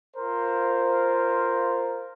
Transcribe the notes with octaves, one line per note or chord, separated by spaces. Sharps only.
F4 A#4 C5